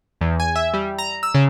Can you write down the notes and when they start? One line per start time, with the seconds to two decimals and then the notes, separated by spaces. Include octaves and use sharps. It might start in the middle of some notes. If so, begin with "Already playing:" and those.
0.21 E2
0.40 G#5
0.56 E5
0.74 G3
0.99 A#5
1.23 E6
1.35 C#3